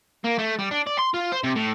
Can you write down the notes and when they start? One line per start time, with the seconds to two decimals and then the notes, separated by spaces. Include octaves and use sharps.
0.24 A#3
0.39 A3
0.59 G3
0.71 D4
0.87 D5
0.99 C6
1.14 F4
1.32 C5
1.43 C3
1.55 A2